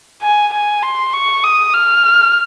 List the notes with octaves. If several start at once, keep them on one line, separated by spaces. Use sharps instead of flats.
G#5
G#5
C6
C#6
D#6
F6